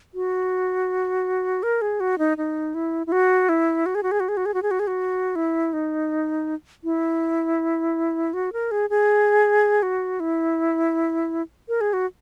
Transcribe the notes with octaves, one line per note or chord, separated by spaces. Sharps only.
F#4
A#4
G#4
F#4
D#4
D#4
E4
E4
F#4
E4
F#4
G#4
F#4
G#4
F#4
G#4
F#4
G#4
F#4
G#4
F#4
G#4
F#4
E4
D#4
E4
F#4
A#4
G#4
G#4
F#4
E4
A#4
G#4
F#4